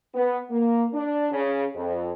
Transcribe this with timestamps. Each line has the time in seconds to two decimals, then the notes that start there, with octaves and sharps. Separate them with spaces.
0.14 B3
0.50 A#3
0.93 D4
1.31 C#3
1.75 F2